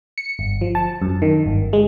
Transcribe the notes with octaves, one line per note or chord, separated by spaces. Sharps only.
C#7
G1
F3
A5
F#2
D#3
G1
G#3